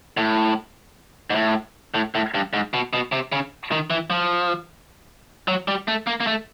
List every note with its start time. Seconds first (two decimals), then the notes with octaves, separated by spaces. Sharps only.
0.17 A2
1.30 G#2
1.35 A2
1.94 A2
2.15 A2
2.34 G2
2.53 G#2
2.74 B2
2.93 B2
3.12 C3
3.32 C#3
3.72 D#3
3.90 E3
4.10 F3
5.48 F#3
5.68 G3
5.88 A3
6.07 A#3
6.20 A#3
6.27 A3